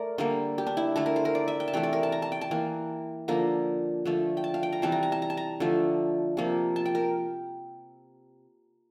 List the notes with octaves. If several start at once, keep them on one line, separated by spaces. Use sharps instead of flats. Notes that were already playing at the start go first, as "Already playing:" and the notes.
Already playing: A3 A#4 D5
D3 G3 A#3
G4
D4
E4
D3 A3 A4
A#4
C5
A#4
D5
E5
G5
A5
C3 E3 A3 G5
D5
A#4
A5
A#5
A5
G5
A5
E3 A#3
D3 F3 A#3 A#5
D3 F3 A3
G5
A5
F5
G5
A#5
C3 E3 G3 A5
A#5
A#5
A5
A#5
A5
A#5
D3 F3 A3
C3 F3 A#3
A5
G5
A#4